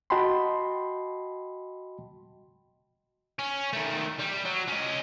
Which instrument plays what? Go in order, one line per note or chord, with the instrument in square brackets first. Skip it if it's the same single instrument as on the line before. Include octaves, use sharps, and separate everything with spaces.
[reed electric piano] F#4 D#5 G5 A5 B5 C6
[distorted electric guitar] C#4
D#3 A3
G3
F#3
C#4 D#5